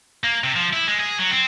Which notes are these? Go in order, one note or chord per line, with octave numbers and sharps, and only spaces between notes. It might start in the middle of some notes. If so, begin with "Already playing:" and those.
A#3
C3
F3
E4
G#3
G#4
F#3
C4